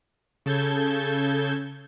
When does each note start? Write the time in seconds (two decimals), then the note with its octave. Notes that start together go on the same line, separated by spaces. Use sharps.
0.46 C#3 A4 A5 G6 G#6